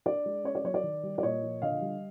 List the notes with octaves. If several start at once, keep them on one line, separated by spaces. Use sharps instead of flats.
D4 D5
G#3
C#4 C#5
D5
F#3 C#5
D5
D#3
G3
D5
A#2 C#5 D#5
F3
D3 D#5 F5
G3